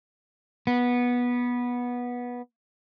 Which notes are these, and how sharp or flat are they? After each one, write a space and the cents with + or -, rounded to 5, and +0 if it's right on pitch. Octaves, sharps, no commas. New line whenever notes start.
B3 -15